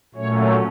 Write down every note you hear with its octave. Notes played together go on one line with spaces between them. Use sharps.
A#2 F#3 A3 C#4 C#5